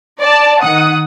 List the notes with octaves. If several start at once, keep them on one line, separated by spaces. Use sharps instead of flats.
D5 A5
D#3 F#5 D#6